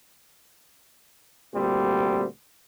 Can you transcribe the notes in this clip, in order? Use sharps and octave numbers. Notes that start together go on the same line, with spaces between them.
D2 A#2 G3 C4